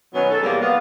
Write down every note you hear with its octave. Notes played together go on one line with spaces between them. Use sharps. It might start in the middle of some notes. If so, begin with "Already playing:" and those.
B2 D#3 F#3 B3 C#4
A4
E2 C3 G3 A#3
B3 F5